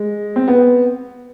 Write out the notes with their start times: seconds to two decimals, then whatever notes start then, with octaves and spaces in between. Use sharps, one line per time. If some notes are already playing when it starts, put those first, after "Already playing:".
Already playing: G#3
0.36 C4
0.48 B3